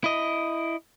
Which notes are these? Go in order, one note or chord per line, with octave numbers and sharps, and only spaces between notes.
E4 D#5